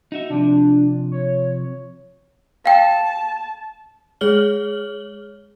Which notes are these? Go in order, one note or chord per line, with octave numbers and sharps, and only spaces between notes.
D#4 F#4 E5
C3 F3 D4
C#5
F5 G5 A5
G#3 G#4 C#5 F6 F#7 G7